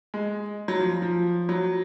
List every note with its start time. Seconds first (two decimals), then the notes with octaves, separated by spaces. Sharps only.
0.14 G#3
0.68 F#3
0.79 F3
1.02 F3
1.49 F#3